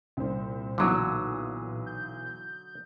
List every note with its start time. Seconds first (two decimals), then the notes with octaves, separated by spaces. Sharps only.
0.17 C2 A#2 C5
0.78 B1 A#2 D3 E3 F#3 D#6
1.86 G6